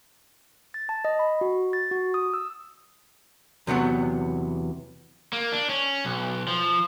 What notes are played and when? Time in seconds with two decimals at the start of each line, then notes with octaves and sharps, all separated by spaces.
0.74 A6
0.89 A5
1.05 D#5
1.19 B5
1.41 F#4
1.73 A6
1.91 F#4
2.14 D#6
2.34 E6
3.67 E2 C3 F#3 B3
5.33 A#3
5.52 D4
5.70 C#4
6.05 B1
6.48 F3